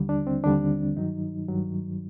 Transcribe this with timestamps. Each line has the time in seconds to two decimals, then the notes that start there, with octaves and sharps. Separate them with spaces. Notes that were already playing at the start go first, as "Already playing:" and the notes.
Already playing: D#2 D3 G3
0.09 D4
0.27 C4
0.44 D#2 D3 G3 D4
0.97 G2 D#3 F#3 D#4
1.48 G2 D#3 F#3